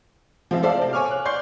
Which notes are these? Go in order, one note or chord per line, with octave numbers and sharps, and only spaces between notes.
F3 G#3 C4 E4 F4
A4 C5 D5 E5 F5 A5
C3 C4
C#5 G#5 C#6 D6 F6
F#6
D5 C6 C#6 G6 C7